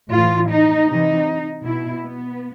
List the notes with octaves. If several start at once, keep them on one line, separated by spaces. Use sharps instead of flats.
A2 E3 F4
D#4
C3 E3 D#4
B2 E4
B3